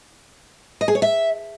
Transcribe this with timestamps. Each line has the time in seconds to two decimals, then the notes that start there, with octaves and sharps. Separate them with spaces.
0.81 D#5
0.88 G#4
0.95 C#5
1.02 E5